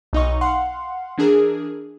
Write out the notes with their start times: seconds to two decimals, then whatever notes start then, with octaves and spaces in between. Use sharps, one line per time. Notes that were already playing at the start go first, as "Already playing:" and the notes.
0.13 B1 D#4 D#5 C#6
0.41 F5 F#5 C6
1.18 E3 D4 G#4 A#4